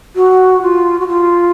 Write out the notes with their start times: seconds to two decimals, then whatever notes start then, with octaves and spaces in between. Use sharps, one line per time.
0.16 F#4
0.62 F4
1.00 F#4
1.07 F4